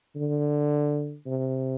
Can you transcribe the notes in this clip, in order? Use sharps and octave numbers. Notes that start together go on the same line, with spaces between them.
D3
C3